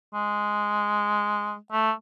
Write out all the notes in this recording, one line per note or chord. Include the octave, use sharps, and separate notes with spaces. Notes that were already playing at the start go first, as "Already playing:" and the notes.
G#3
A3